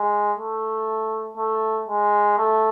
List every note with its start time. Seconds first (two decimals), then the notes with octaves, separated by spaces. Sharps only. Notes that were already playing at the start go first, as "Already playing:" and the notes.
Already playing: G#3
0.38 A3
1.37 A3
1.89 G#3
2.38 A3